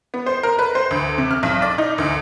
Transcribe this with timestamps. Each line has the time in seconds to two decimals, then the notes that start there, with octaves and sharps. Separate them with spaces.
0.14 B3
0.26 C5
0.43 A#4
0.59 B4
0.75 C5
0.91 D2
1.18 C3
1.31 F6
1.43 B1
1.62 D5
1.78 D#4
1.98 D2